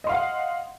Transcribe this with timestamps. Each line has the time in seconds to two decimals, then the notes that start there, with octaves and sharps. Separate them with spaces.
0.04 D#5
0.07 C6
0.09 F5
0.12 F#5